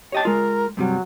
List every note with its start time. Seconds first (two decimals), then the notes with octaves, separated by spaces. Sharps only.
0.12 G4 C#5 D#5 A5
0.25 G#3 F4 A#4
0.77 G2 C3 F#3 G3